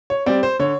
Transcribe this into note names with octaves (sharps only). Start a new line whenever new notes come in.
C#5
G3 C4 D5
C5
D3 C#5